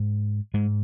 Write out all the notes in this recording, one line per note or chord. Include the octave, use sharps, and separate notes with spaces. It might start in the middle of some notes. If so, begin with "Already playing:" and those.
Already playing: G#2
G#2 G#3